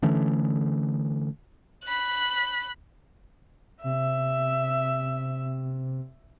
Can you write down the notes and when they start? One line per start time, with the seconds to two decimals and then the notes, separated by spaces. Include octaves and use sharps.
0.02 D3 E3 A3 C#4
1.84 B5 F#6
3.84 C3 E5